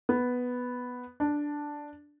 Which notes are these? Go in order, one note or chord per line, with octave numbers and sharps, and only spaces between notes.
B3
D4